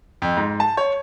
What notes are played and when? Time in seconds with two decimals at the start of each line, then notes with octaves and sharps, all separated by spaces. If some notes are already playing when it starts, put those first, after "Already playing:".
0.22 F2
0.37 G#2
0.60 A5
0.77 C#5